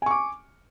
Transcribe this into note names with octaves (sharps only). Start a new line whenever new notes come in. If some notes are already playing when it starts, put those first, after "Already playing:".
G#5 C#6 D6